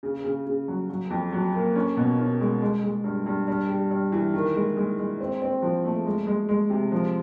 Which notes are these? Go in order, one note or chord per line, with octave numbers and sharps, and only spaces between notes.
C#3
C#3
C#3
F#3
F#3
F2
F#3
A#3
C#4
B2
C#4
G#3
G#3
G#3
G2
G2
G2
G3
G2
E3
D#3
G#3
G#3
G#3
C4
C4
F3
A3
G#3
G#3
G#3
C3
F3